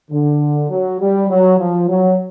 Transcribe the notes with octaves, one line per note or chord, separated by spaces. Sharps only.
D3
F#3
G3
F#3
F3
F#3